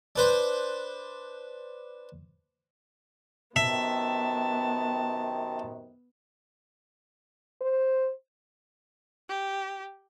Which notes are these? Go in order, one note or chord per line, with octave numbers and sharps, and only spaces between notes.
D4 B4 C5
F#2 C3 D#3 B3 E5 A5
C5
G4